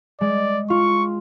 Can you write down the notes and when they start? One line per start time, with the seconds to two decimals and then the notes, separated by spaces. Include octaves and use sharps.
0.21 G#3 D5
0.70 F4 C#6